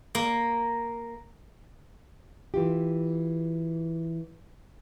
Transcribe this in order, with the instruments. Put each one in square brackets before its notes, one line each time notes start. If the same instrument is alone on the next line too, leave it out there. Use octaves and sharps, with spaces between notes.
[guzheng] A#3
[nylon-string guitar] E3 F4 G4